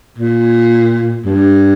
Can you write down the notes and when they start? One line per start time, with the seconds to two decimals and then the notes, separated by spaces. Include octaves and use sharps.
0.18 A#2
1.25 G2